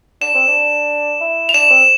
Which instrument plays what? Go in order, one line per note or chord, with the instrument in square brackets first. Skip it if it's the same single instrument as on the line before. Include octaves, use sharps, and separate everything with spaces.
[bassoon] D4 [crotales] E7
[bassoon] C4
D4
E4
[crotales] F7
[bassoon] D4 [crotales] E7
[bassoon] C4